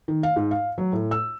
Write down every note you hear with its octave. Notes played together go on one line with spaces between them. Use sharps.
D#3
F5
G#2
F5
F#3
A2
E6